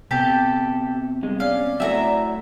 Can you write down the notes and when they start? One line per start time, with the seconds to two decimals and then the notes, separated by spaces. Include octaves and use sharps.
0.11 C3 B3 C4 G4 A4 A5
1.23 G2 G#3
1.40 C#4 D5 F5
1.80 F#3 A3 E4 E5 G#5 A#5